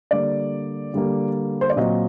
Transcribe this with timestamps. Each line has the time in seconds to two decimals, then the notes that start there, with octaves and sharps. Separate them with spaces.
0.11 D3 G3 A#3 D5
0.94 D3 G3 A#3
1.61 C5
1.70 D5
1.76 A#2 F#3 C4 D#5